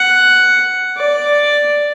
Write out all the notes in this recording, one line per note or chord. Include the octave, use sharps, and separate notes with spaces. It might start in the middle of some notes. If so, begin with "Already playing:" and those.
Already playing: F#5
D5